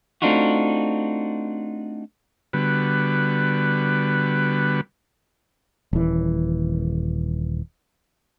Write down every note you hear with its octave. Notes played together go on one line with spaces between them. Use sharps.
A3 C4 D4 D#4 F4 F#4
D3 G3 B3 F#4 B4
D#1 E3